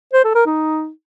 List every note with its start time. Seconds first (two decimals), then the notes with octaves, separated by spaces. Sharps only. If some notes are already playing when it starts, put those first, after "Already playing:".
0.13 C5
0.24 A4
0.35 A#4
0.46 D#4